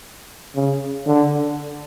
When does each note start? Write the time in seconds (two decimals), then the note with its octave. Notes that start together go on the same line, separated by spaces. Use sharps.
0.56 C#3
1.07 D3